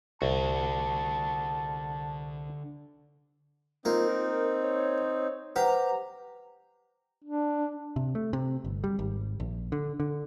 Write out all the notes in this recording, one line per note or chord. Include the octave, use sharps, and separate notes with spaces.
C2 D3 F#4 A5
A#3 C4 D#4 F4
A#4
C#5
G4 B4 C5 F#5 A#5
D4
C3
A3
C3
G1
G3
G#1
A#1
D3
D3